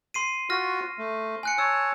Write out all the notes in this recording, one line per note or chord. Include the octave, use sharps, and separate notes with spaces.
C6 C7 D#7
F4 F#4 F6 A#6
A3
G#5 F#6 C#7
C#5 A5 E6